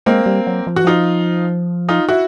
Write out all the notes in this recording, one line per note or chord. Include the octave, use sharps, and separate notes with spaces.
G#3 A#3 C4
G3
F#3
F3
E3 F#4
F3 D#4 F4
D#4 F4
E4 F#4